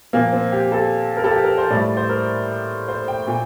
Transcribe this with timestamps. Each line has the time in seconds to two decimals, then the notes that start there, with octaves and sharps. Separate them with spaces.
0.13 A#2 F3 A#3
0.33 C4
0.52 G4
0.72 A4
1.17 A#4
1.24 A4
1.32 G4
1.44 A#4
1.58 C5
1.70 A2 G3 D5
1.97 C5
2.09 A#4
2.88 C5
3.08 G5
3.27 A#2